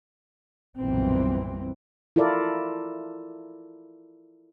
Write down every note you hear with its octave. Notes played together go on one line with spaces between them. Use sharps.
F#1 B1 A#2 E3 G3 C4
E4 F4 A4 A#4 D5